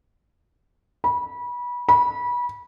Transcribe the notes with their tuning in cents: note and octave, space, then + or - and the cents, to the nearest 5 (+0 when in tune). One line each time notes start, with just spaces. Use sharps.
B5 -25
B5 -25